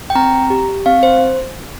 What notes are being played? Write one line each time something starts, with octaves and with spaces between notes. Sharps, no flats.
G5
C4 A#5
G4
C4 F5
C5